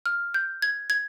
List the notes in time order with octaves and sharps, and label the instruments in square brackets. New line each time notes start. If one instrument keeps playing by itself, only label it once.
[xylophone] F6
G6
G#6
G#6